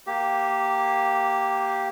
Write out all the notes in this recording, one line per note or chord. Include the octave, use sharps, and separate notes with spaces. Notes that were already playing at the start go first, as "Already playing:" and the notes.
A#3 G4